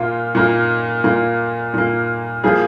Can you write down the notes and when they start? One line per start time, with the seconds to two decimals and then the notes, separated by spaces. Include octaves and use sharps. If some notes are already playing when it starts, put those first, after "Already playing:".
Already playing: A#2 A#3 F4
0.35 A#2 A#3
1.04 A#2 A#3
1.74 A#2 A#3
2.44 F3 A#3 G#4